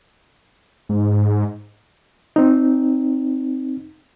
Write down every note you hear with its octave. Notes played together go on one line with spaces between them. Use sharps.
G#2
C4 D#4